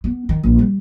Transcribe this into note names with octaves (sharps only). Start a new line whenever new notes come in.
B3
D#3
A#1
G3